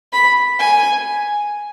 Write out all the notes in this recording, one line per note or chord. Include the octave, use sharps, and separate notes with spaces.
B5
G#5